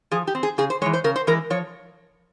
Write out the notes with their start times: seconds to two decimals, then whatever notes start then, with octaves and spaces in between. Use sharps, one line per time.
0.11 F3 G#4
0.27 G4
0.35 C4
0.43 G#4
0.58 C#3 G#4
0.70 C5
0.82 G#3 C#5
0.86 E3
0.93 C5
1.04 C#3 A#4
1.16 C5
1.27 E3 G#3 A#4
1.50 F3 C#5